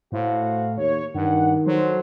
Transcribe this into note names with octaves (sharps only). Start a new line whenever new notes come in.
A2 F#4 C5 F5
D#2 C#5
G2 D#3 F#5
D2 F#3 A4 C5